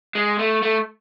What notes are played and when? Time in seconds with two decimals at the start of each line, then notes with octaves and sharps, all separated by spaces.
0.15 G#3
0.39 A3
0.62 A3